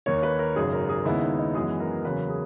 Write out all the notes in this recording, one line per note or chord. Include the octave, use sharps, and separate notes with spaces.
D#2 D#3 A#3 C#5
B4
A#4
G#1 F#2 C#3 G#4
A#4
G#4
D#2 C#3 G#3 B3 E4
D#4
D#4
F#2 E3 G#3 B3 G#4
A#4
E2 C#3 F#3 A#3 B4
G#4